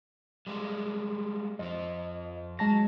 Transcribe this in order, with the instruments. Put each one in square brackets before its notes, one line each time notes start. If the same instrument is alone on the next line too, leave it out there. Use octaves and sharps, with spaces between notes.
[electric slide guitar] G3 G#3 A#3
[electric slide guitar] F2 F3 [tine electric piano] D#5
[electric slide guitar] F#3 [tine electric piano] G#3 A5 A#6